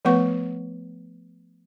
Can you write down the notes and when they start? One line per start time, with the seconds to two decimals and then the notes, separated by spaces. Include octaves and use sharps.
0.05 F3 A3 B3 B4 F#5 C#6